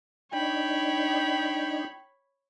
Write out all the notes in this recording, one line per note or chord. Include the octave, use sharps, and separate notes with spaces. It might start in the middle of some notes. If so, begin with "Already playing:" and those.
D4 D#4 C#5 G5 B5